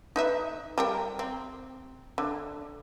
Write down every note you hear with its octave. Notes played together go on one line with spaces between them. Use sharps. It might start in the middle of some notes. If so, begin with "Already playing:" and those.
D#4 B4 E5
G3 A#4 G5
C4
D3